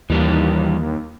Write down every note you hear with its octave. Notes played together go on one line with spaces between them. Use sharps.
D#2 E3 G3 D4